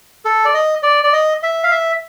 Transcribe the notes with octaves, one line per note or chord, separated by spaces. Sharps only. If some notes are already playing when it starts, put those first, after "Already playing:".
A4
D5
D#5
D5
D5
D#5
E5
F5
E5